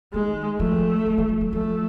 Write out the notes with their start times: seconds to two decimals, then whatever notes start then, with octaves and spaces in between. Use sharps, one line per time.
0.13 D#3 G#3
0.60 F3 A3
1.06 F3
1.18 E3
1.29 F3
1.41 F#3
1.53 F3 A3